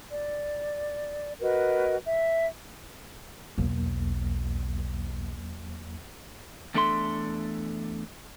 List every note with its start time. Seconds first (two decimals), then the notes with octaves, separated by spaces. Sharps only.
0.11 D5
1.41 F#4 A#4 B4 D#5
2.05 E5
3.58 B1 E2 F#3 A#3
6.74 E2 A3 D4 A4 E5 C6